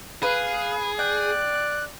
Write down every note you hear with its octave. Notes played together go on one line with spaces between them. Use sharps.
G#4 B4 F5
D5 G5 F#6